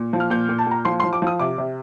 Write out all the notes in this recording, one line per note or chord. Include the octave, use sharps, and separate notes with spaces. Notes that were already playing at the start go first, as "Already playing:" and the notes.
Already playing: A#2
F3
F6
A#2 G6
A#2
A5
A#2 A#5
F3 C6
C6
F3
D6
F3 D#6
C3 D6
C3